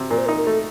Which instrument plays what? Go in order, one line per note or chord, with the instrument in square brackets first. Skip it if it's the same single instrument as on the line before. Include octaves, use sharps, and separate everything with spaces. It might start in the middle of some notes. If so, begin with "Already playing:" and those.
Already playing: [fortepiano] C3
[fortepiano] A#2 [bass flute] A#4
[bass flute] C5
A#4
[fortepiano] D#4
[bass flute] A#4
[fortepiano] A3 [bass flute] A4